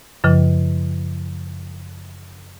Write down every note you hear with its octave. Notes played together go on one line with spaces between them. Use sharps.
F#2 C#3 F3